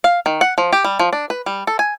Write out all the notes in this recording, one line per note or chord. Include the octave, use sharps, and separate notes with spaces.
F5
D#3
F#5
F3
G4
G3
F3
D4
B4
G3
A4
G#5